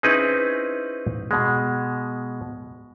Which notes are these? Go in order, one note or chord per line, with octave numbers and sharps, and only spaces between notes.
C4 C#4 D#4 E4 G#4 B4
B2 G#3